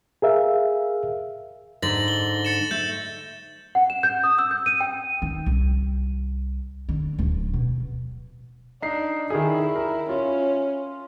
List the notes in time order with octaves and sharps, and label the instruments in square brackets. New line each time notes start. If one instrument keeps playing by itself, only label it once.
[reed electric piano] G#4 A#4 E5 F5
[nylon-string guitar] G#2 D3 [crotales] A6 A#6 F#7
[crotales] G7
A6 C#7 E7
[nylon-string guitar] A3 [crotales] G6
[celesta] F#5
E7
G6
D#6
E6
G6
D#7
G5
[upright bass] D#3
C2
D3
D1
B2
[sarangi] D4 [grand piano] D#4 C7
[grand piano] D#3 G#4 [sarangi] E4
[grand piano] A#4
[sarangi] C#4 [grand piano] F4